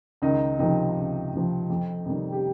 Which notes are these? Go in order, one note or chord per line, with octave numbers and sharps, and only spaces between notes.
C#2 D#3 D#4
C3 D#3 F3 D#4
C#2
C3 F3
F2
C3 D#3 G3
G4